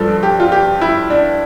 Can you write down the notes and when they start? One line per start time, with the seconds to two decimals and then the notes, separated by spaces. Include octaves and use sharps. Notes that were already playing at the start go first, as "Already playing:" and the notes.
Already playing: G2 F3 A4
0.23 G4
0.40 F4
0.52 G4
0.81 E4
1.10 D4